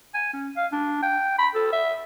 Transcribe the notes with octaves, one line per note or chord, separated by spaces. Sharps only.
G#5
C#4
F5
D4
G5
B5
A4
E5